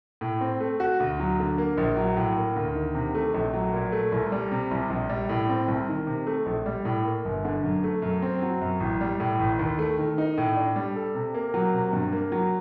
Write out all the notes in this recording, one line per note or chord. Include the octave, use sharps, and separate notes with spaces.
A2
C4
A3
F#4
D2
F#3
D3
A#3
A#1
F#3
A2
A#3
D2
D#3
C3
A3
A#1
F#3
A#2
A3
C2
G3
C3
C2
A#1
G3
A2
C4
C2
D#3
C3
A3
A#1
G3
A2
A#3
G1
D3
F#2
A3
F#2
C4
F#3
F#2
A1
G3
A2
A1
D#2
A3
D#3
D#4
A2
D4
G3
A4
C3
A#3
F#3
C3
G2
A#3
F#3